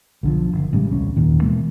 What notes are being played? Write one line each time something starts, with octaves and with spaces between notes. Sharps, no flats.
B1 D3 F3
F#1
A1 C#3 G3 G#3
D#1 C2 C#4
F#1 D#2 A#2 D#3
B2 E3 G#3 A#3